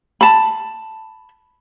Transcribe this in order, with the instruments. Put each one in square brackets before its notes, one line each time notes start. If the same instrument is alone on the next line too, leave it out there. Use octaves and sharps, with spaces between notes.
[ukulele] A5 B5